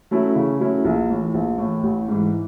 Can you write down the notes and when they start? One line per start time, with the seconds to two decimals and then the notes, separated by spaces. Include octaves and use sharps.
0.11 F#3 A3 C#4 E4
0.36 C#3
0.60 F#3 A3 C#4 E4
0.85 A#1
1.10 A2 E3
1.34 A#1
1.58 A2 E3
1.83 A1
2.08 G#2 E3